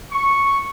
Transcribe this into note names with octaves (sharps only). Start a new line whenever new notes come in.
C#6